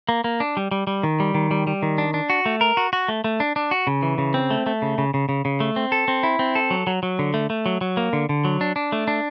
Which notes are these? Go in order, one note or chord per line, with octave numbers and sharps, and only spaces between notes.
A#3
A#3
D4
G3
G3
G3
D#3
G3
D#3
G3
G3
D#3
D4
D4
F#4
A3
A#4
F#4
F#4
A3
A3
D4
D4
F#4
C#3
E3
C#3
C4
A3
A3
C#3
C#3
C#3
C#3
C#3
A3
C4
A4
C4
E4
C4
A4
F#3
F#3
F#3
D3
A3
A3
F#3
F#3
A#3
D3
D3
F#3
D4
D4
A3
D4